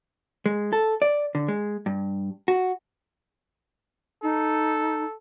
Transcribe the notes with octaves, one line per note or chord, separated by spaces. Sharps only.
G#3
A4
D5
D3
G#3
G2
F#4
D#4 A4